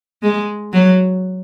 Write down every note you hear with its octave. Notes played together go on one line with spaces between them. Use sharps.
G#3
F#3